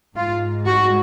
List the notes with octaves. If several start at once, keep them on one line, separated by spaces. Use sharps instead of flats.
G#2 F4
F#4